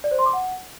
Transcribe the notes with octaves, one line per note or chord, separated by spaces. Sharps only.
D5
C5
C6
D6
F#5